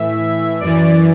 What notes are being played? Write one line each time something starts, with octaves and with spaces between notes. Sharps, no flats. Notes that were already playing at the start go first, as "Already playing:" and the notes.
Already playing: A2 E3 E5
F#2 E3 D5